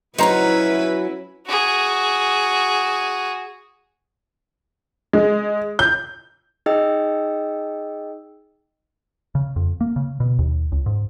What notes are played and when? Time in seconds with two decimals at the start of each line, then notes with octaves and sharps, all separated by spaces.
0.18 F#3 C#4 D#4 E4 F#4 B4 C5 A#5
1.47 F#4 G#4
5.13 G#3
5.79 G6
6.66 D#4 G#4 D#5 G5 E6
9.35 C#3
9.56 F2
9.81 A#3
9.96 C#3
10.20 B2
10.39 D#2
10.72 C#2
10.86 G#2